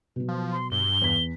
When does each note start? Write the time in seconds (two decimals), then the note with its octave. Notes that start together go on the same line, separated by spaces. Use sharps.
0.16 B2 F#3
0.28 F3
0.52 C6
0.71 G2 G7
1.01 E2 B6